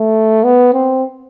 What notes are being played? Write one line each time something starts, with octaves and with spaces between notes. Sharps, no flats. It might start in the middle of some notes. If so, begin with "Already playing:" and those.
Already playing: A3
B3
C4